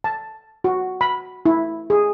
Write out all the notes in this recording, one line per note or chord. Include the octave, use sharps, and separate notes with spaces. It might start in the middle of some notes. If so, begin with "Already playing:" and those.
A5
F#4
B5
E4
G#4